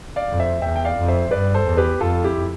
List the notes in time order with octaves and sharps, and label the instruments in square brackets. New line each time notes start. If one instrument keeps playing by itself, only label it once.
[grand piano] D5 F5
[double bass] F2
[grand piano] C5 E5
[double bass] E2 [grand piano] E5 G5
[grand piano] G5
D5 F5
[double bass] F2
[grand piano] C5 E5
[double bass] G2 [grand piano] B4 D5
[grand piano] A4 C5
[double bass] E2
[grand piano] G4 B4
[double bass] F2 [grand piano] F4 A4
[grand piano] E4 G4